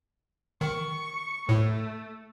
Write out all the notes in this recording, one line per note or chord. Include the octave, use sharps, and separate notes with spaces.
D#3 C#6
A2 A3